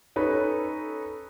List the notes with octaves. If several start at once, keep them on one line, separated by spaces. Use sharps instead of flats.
C#4 D#4 A4 B4